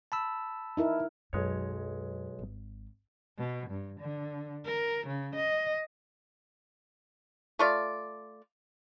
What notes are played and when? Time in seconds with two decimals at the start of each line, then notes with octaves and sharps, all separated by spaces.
0.12 A5 B5 E6
0.77 D#4 E4 A#4
1.33 B1 F#2 G#3 C#5
2.39 G#1
3.38 B2
3.70 G2
4.00 D3
4.65 A#4
5.07 C#3
5.35 D#5
7.59 A3 F4 D5